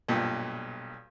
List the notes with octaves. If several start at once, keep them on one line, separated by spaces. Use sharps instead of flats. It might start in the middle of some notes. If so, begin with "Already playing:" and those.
B1 G2 A#2